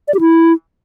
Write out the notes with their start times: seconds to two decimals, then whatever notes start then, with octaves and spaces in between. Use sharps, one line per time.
0.08 D5
0.14 G4
0.21 E4